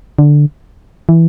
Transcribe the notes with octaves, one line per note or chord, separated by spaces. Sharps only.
D3
E3